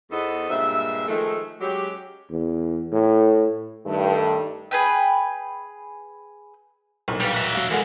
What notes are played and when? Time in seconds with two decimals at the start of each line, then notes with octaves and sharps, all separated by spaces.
0.10 E2 B3 D#4 A4 C5 D#5
0.49 G2 A#2 G#3 E5
1.07 D#3 F3 G#3 A3
1.60 F#3 G#3 C#4 G4
2.30 E2
2.92 A2
3.86 G2 D#3 A3
4.71 G#4 B4 G5
7.08 B1 A#2
7.20 G3 D4 B4 F5
7.34 F#4 E5
7.54 F#3 F5
7.71 E3 G#3 A4 A#4 F#5